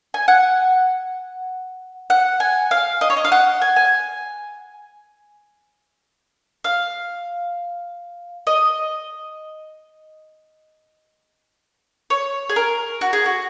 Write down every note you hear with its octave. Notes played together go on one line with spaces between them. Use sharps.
G#5
F#5
F#5
G#5
F5
D#5
C#5
D#5
F5
F#5
G#5
G#5
F5
D#5
C#5
G#4
A#4
F#4
G#4
F#4